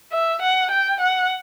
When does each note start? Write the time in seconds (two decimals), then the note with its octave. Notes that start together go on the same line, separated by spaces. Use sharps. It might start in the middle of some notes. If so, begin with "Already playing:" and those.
0.13 E5
0.42 F#5
0.71 G5
1.01 F#5